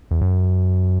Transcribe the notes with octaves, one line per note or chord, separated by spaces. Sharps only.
E2
F#2